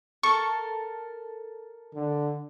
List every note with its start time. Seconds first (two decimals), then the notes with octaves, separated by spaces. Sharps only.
0.23 A4 A#4 C#6
1.95 D3